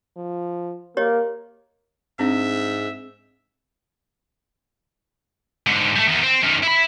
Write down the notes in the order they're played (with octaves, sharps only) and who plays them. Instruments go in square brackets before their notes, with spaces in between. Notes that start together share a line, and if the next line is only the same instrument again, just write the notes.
[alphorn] F3
[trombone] A#3 [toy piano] G4 C#5 D#5 [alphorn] A#4
[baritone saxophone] G#2 [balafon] C4 D4 [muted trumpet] E5
[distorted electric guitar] G#2 D3
G3 A3
E2 D#3
C4
F#2 D#3
E4 B5